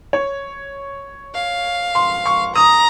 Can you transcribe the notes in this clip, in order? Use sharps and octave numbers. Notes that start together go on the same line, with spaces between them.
C#5
F5
C6
C#6
A#5 D#6